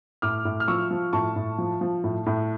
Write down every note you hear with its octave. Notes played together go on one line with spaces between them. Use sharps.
A2 D6 F6
A2
F6
F3 C#6 E6
F3
A2 A5 C#6
A2
F3
F3
A2
A2